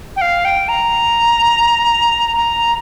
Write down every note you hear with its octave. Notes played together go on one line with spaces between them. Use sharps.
G5
F5
G5
A#5
A#5